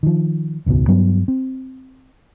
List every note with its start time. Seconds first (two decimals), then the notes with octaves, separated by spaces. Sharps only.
0.03 D#3 F3
0.66 E1 C#2 G#2 B2
0.88 G2 F#3 B3
1.28 C4